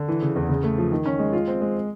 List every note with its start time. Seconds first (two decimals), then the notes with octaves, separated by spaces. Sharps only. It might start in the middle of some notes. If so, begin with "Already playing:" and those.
Already playing: D3
0.08 E3
0.22 C#3
0.36 E2
0.49 C#3
0.64 A3
0.78 F3
0.92 D#3
1.06 C#4
1.19 G#3
1.33 F4
1.48 C4
1.61 G#3